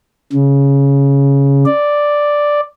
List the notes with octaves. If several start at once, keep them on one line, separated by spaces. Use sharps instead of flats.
C#3
D5